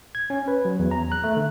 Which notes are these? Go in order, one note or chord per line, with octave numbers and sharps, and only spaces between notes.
G#6
C#4
B4
F#3
E2
A#5
F#6
A3
D3